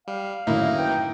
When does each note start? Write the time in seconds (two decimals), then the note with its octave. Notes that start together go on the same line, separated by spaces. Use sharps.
0.08 G3 F5
0.47 F#2 A2 D3 D#3 A#3 D#4 E4
0.78 B4 G5